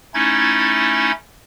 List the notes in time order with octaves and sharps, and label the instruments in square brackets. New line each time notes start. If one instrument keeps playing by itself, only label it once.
[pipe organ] A3 C#4 D#4 E4 G#6 A6